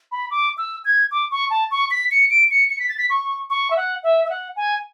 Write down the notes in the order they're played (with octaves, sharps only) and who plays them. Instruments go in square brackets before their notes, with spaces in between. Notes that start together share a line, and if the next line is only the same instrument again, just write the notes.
[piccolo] B5
D6
E6
G#6
D6
C#6
A5
C#6
B6
C#7
D7
C#7
C#7
B6
A6
B6
C#6
C#6
E5
F#5
E5
E5
F#5
G#5